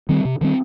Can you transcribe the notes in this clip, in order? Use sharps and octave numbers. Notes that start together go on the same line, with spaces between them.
D#3 G3 C4
C3
D#3 G3 C4